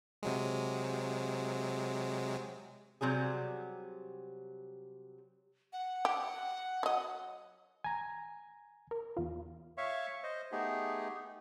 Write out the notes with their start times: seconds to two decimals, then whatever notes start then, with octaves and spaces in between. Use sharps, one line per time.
0.23 C3 F#3 G#3
3.01 C3 F#3 G3 G#4
5.73 F#5
6.05 G4
6.83 F#3 D#5
7.84 G#5 A#5
8.91 A#4
9.17 E2 F4
9.78 C#5 E5 F5 C#6
10.24 C5 D#5
10.52 A3 B3 D#4 G4 G#4